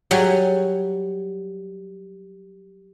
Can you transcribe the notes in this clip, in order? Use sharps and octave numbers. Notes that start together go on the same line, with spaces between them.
F#3 G3 G#5